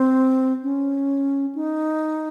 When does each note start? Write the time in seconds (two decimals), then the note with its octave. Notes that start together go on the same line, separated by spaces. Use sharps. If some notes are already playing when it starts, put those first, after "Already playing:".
Already playing: C4
0.63 C#4
1.55 D#4